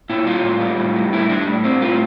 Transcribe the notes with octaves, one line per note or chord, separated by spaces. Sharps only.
A#2 E4
G3 F4
A2
G3
A2
G3
A2 E4
G3 D4
A2
G3 C4
A2 F4